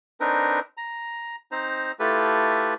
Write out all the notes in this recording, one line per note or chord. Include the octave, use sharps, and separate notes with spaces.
C4 D4 D#4 A#4 B4
A#5
C4 D#4 C5 A#5
A3 E4 F4 G4 A4 B4